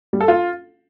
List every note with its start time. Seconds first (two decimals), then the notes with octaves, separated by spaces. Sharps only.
0.13 G3
0.21 A4
0.28 F4